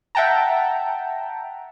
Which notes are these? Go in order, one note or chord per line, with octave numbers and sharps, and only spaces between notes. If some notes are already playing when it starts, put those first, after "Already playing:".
E5 F#5 G5 A5 A#5